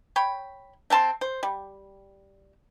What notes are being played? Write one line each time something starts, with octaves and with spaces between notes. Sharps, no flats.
C#5 G5 B5
A3 C4 A5 C6
C5
G3